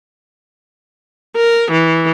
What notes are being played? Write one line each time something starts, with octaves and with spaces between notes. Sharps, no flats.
A#4
E3